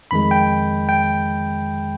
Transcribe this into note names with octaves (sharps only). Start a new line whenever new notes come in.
F2 D#3 G#3 B5
G5
G5